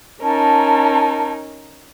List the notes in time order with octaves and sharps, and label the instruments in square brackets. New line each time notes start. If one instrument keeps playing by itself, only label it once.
[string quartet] C#4 D#4 A#4 [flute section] A5